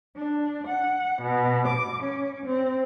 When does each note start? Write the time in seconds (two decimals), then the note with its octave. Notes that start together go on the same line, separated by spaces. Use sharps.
0.14 D4
0.66 F#5
1.20 B2
1.66 D6
2.01 C#4
2.44 C4